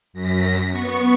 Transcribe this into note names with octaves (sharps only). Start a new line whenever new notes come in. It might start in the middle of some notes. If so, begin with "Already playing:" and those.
F#2 A#6 B6
B3 C#6